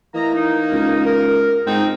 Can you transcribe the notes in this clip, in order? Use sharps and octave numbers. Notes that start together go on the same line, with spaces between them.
E3 A3 A#3 D#5 A#5
D#4
C#2
A#4
G#2 C4 D#4